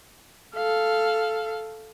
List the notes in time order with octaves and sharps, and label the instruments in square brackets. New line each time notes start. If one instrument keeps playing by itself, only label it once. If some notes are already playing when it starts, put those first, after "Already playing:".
[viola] A4 F5